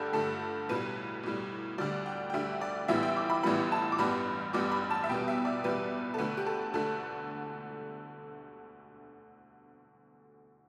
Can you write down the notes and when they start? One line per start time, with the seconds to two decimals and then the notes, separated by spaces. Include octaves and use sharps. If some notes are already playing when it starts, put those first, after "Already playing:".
Already playing: G2 D3 A3 G4 A4 A5
0.13 G2 D3 A3 A4
0.69 B1 A2 G3 B4
1.23 B1 A2 G3
1.78 D2 D3 G3 D5
2.06 G5
2.30 G5
2.34 D2 D3 G3 E5
2.61 D5
2.88 A1 A2 E3 G3 B3 E5
3.03 G5
3.16 D6
3.29 B5
3.43 A1 A2 E3 G3 B3 B5
3.72 A5
3.92 D6
3.98 A1 G2 G3 B3 B5
4.53 A1 G2 G3 B3 D6
4.72 B5
4.90 A5
5.04 E5
5.09 E2 B2 G3 B3 G5
5.28 E5
5.45 D5
5.64 E2 B2 G3 B3 B4
6.14 A4
6.18 D2 D3 A3 B4
6.37 G4
6.46 A4
6.74 D2 D3 A3 A4